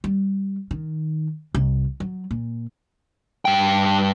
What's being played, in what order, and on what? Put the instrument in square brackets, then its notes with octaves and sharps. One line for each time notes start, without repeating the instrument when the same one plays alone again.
[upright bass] G3
D#3
C2
F#3
A#2
[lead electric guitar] G2 G5